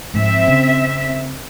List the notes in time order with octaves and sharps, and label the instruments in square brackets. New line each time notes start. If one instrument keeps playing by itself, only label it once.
[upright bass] G#2 F3 [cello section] C4 E5
[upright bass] C#3 C#4